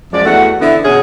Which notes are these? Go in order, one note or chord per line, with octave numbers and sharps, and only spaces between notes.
F#2 F3 G#3 D5
E2 A3 F#4 F#5
D3 E3 B3 E4
B2 C#4 G#4